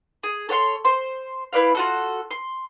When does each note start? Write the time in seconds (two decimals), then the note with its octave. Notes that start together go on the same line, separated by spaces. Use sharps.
0.23 G#4
0.49 A4 C#5 F#5 C6
0.85 C5 C6
1.53 E4 B4 D5 F5
1.75 F4 F#4 A4
2.31 C6